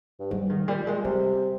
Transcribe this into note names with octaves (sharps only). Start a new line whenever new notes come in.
G2
G#2 G3
G#2 D#3
A#2 G3
A#2 G#3
C3 G3